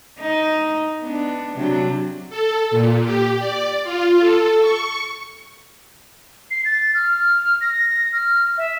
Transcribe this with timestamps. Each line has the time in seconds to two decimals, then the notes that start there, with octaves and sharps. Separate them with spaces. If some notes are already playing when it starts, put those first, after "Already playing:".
0.20 D#4
1.01 B3 D4
1.56 C3 F#3 D4
2.30 A4
2.71 A#2
3.04 G4
3.39 D5
3.83 F4
4.20 A4
4.61 C#6
6.51 C7
6.65 A6
6.95 F6
7.61 A#6
8.13 F6
8.58 E5